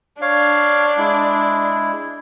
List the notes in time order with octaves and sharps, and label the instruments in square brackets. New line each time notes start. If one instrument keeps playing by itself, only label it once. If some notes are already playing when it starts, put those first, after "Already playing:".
[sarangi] D4 [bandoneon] C#5 F5
[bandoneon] G#3 E4